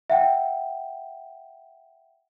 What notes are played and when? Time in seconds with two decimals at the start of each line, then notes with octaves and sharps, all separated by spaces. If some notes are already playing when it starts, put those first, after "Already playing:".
0.10 E5 F#5 G5